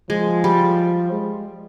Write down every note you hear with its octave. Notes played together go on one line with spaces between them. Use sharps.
F3 G#3
G3
G#3